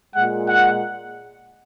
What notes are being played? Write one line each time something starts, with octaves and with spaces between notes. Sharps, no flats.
A#2 G#3 F#5
F#5